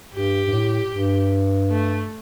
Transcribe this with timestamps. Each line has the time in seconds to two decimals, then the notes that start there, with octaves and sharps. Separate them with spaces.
0.14 G2 G4
0.48 G2
0.53 A2
0.92 G2
1.70 A3